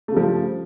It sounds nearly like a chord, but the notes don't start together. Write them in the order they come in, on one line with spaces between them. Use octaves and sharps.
A3 C#3 G3 F3